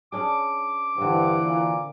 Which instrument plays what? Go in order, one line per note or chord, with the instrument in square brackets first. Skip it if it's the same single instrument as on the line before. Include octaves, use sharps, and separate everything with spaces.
[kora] C#4 D4 G#4 [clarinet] D6
[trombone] G2 [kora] D3 C4 [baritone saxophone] E3
[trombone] A#2